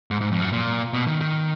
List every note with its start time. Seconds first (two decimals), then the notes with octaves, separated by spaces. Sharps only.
0.11 G#2
0.21 G#2
0.32 F2
0.42 F#2
0.53 A#2
0.93 B2
1.07 D#3
1.21 D#3